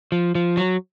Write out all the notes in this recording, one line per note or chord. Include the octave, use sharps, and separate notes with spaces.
F3
F3
F#3